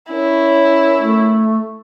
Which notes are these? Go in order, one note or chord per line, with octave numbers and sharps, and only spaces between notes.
C#4 E4 A#4 C#5
A3